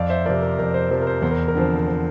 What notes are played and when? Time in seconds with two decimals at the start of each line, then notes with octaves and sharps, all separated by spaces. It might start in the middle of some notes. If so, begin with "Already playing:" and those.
Already playing: F2 D5 F5
0.09 C5 E5
0.25 C3 F3 A#4 D5
0.42 A#4
0.59 F2 A#4
0.74 C5
0.90 C3 F3 A#4
1.02 A#4
1.07 C5
1.22 E2 C5
1.31 A#4
1.48 A#4
1.55 D3 F3 C4
1.77 A#4
1.87 C5